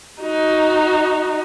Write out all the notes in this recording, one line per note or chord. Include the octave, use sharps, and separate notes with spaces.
D#4 F#4